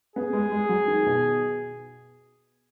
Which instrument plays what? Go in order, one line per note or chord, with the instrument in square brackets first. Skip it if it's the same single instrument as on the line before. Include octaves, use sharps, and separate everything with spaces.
[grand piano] B3 [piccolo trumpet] G#4
[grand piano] G#3
G#3
F#3
D#3
B2